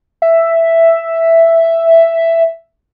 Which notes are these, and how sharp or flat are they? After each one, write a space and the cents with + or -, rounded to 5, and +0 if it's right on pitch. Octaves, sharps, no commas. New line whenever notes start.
E5 +5